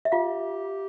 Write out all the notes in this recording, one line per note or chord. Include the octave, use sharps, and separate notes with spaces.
E5
F4 G4 F5